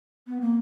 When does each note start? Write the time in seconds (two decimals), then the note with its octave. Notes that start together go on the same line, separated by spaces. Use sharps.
0.27 B3
0.40 A#3